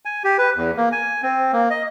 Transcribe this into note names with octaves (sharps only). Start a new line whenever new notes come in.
G#5
G4
B4
E2
A#3
G#5
C4
A#3
D#5